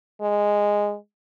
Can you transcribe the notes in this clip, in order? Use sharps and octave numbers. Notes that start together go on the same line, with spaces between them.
G#3